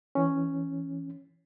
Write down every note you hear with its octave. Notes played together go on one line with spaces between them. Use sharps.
E3 C#4